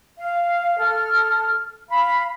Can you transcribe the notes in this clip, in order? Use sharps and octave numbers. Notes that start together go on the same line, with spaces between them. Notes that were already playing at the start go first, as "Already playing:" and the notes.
F5
A4 F6
F5 B5